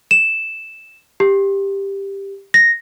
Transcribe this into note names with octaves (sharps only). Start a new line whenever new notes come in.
E7
G4
A#6